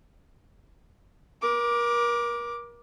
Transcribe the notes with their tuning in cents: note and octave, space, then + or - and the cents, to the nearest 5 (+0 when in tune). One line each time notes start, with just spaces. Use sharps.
A#4 +35 D6 +0